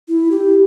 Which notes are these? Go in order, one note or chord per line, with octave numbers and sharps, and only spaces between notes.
E4
G4